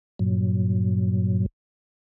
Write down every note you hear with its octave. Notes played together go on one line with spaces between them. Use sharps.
G2 A#2 F#3